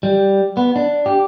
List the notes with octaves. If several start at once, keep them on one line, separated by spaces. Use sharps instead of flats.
G3
B3
D4
G4